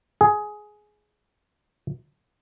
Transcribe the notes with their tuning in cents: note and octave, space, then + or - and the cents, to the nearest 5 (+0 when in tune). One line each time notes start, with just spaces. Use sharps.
G#4 +15